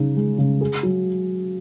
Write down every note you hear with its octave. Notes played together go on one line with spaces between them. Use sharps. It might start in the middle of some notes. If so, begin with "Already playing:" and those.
Already playing: C#3 D#4
G#3
C#3
G#4
F#3